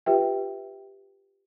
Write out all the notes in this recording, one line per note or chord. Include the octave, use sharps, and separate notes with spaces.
F4 G4 B4 E5 G5